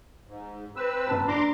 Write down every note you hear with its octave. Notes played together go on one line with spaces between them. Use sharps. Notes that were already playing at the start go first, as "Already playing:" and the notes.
G#2
C4 B4 E6
F#1 A5
D4 A#5 C6 D6